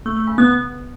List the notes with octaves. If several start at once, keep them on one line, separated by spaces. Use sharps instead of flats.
A3
A3
C#3
B3